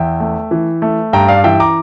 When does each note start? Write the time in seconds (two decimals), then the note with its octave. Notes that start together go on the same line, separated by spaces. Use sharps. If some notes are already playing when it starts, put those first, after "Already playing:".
Already playing: E2 E5 G5
0.20 A3
0.51 E3
0.82 A3
1.13 G2 G5 A#5
1.29 D5 F5
1.44 E3 E5 G5
1.60 A#5 D6